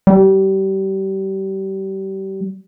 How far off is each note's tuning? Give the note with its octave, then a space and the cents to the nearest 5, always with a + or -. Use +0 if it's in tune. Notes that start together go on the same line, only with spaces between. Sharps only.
G3 -30